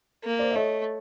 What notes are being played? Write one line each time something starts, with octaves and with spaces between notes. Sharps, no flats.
A#3
C5 D5
E5
A3 C#5 D#5